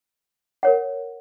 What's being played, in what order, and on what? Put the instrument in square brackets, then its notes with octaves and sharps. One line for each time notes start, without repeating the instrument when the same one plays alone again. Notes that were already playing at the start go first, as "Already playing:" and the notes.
[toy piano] A#4 C#5 F#5